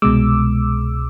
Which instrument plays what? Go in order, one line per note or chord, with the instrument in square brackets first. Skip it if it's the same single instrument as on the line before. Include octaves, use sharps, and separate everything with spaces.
[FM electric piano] C2 B2 G#3 D6 E6